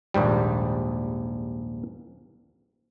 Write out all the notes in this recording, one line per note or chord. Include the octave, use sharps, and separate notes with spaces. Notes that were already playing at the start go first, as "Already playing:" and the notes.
A#1 D#2 G#2 G3